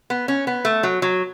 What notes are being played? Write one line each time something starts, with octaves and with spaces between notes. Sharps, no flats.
B3
C#4
B3
A3
F#3
F#3